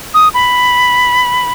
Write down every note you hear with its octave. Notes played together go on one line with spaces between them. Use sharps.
D#6
B5